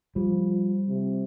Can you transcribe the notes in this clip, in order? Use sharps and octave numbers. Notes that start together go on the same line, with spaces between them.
F3 G3
C3